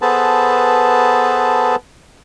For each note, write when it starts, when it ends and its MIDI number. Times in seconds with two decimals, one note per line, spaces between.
0.02 1.76 59
0.02 1.76 68
0.02 1.76 69
0.02 1.76 71
0.02 1.76 72
0.02 1.76 81